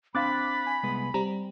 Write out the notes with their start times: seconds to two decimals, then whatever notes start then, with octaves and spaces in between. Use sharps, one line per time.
0.15 C4 D4 F5 B5 D6 F#6 A6
0.67 G#5
0.83 C2 G#3 B3
1.14 G3 C4 G4 A#5